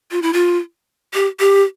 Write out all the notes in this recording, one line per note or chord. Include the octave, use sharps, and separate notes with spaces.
F4
E4
F4
G4
G4